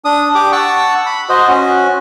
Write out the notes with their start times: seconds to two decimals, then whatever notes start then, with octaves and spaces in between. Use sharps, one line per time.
0.05 D4 D#6
0.35 G4 D6
0.52 F#5 A5 C#6 E6
1.06 B5
1.29 F#4 C5 D#5
1.49 C#4 F#4